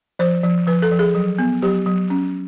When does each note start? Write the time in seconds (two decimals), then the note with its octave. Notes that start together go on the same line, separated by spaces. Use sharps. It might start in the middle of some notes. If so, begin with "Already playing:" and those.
0.19 F3 C5
0.44 F3
0.67 F3 B4
0.82 A4
0.91 F3
0.99 G#4
1.15 F#3
1.39 B3
1.62 F#3 G4
1.86 F#3
2.10 C#4